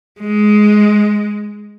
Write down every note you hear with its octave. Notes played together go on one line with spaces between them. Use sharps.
G#3